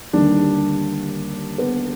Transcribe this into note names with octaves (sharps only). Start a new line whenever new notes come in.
D#2 D3 G3 D4
B3